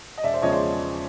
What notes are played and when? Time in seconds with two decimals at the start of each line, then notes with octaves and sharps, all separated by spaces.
0.18 D#5
0.23 E1 D5 E5
0.34 C5 D5
0.42 E2 C#3 F3 G#3 C#5 D#5
0.52 C5 D5